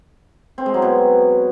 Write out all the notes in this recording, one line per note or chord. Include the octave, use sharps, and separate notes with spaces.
C4
G#3
F#3
B2